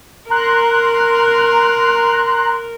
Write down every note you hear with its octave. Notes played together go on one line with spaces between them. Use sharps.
A#4 A#5 C6 F#6